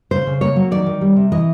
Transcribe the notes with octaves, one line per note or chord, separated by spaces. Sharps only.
C#3 C5
C#3
A#3 C#5
F#3
D#3 D5
D#3
G3
C3
E3 D#5